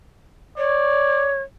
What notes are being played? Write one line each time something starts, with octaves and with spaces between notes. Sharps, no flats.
C#5 D5